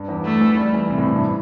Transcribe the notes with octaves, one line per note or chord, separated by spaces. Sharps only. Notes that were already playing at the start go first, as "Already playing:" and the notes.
Already playing: G2
E2
A3
E3
G3
E3
C3
A2
C3
G2